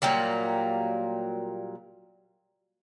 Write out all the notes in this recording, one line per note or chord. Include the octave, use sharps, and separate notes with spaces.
A#2 F#3 G3 A#3